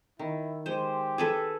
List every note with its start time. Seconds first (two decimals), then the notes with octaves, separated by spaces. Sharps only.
0.19 D#3 E4
0.66 G#3 G4 C5
1.18 G#4 A4 B4